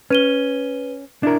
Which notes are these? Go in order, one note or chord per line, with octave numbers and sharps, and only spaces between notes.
C#4 B4 D#7 G7
D4 E4 A#4